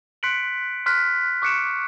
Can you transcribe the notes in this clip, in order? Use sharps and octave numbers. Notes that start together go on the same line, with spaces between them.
C6 F#6 B6 C#7 D7 F#7
C6 F6 F#6 B6
C#6 D6 F#6 C#7 D7 E7